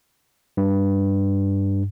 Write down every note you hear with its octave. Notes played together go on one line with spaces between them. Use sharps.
G2